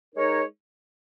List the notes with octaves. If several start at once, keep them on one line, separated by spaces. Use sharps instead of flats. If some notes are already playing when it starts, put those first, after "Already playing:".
G#3 D#4 A#4 C#5